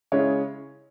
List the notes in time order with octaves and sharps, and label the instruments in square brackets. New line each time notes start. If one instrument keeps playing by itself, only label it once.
[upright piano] C#3 G#3 C#4 E4 C#5